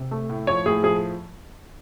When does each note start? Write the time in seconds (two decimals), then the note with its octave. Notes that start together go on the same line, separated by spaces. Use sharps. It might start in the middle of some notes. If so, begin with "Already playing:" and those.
Already playing: C3
0.11 A3
0.30 A2
0.47 F3 C#5
0.66 A2 G#4
0.83 F3 G#4